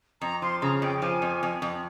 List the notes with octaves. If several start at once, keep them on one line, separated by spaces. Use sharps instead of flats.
F2 A#5
F3 C6
C#3 A#5
F2 G5
F3 G#5
F2
F2
F2